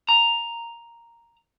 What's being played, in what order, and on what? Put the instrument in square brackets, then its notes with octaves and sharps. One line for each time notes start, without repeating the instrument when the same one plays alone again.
[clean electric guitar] A#5